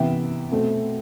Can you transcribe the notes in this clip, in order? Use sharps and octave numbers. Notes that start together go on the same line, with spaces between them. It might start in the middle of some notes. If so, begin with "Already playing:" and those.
Already playing: C3 E3 B3 E5 G5
B2 A3 C4